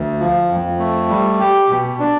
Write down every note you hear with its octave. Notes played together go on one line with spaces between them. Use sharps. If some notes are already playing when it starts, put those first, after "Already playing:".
Already playing: D2
F3
F2
A3
G3
G4
B2
D4